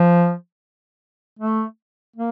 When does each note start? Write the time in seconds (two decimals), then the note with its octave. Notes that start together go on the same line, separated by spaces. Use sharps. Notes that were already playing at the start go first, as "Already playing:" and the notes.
Already playing: F3
1.39 A3
2.16 A#3